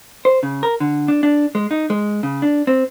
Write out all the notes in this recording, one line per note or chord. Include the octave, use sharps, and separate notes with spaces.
C5
C#3
A#4
D3
D4
D4
G#3
D#4
G#3
C#3
D4
C4